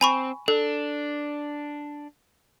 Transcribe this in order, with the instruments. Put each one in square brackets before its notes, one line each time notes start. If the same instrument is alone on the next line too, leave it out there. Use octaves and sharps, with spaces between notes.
[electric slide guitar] C4 [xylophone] G#5 B5 C#6
[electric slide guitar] D4 [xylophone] A4